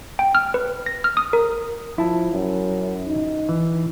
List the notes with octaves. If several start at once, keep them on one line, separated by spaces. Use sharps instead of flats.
G5
F6
B4
A#6
F6
D#6
A#4
F3 E4 A5
F#2
D#4
E3